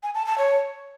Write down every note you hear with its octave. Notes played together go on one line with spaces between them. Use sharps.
G#5
A5
A5
C#5